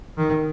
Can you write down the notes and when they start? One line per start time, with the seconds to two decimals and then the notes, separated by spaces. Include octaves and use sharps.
0.18 D#3